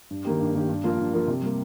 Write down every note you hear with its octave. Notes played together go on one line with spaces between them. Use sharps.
G2
D#3 A#3 G4
G2
D#3 A#3 G4
G2
F3 A#3 F4 A#4
G2
F3 A#3 F4 A#4
C3
G3 A#3